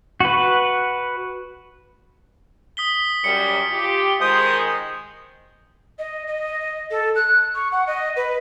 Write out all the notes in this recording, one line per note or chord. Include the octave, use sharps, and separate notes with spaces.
F#4 B4
D#6 B6 G7
F#2 G3 C#7
F4 G4
D#3 G#3 C5 D#6
D#5
D#5
A4
F#6
C#6
F#5
D#5
B4